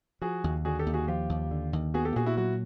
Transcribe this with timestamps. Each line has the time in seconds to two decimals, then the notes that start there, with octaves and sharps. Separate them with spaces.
0.22 F3 F#4 G#4
0.44 D#2
0.65 D3 F#4 G#4
0.79 G4 A4
0.86 D#2
0.94 F#4 G#4
1.08 F3 F4 G4
1.29 D#2
1.51 D3
1.73 D#2
1.94 B3 F#4 G#4
2.05 G4 A4
2.16 A#2 F#4 G#4
2.26 E4 F#4
2.37 F#3 E4 F#4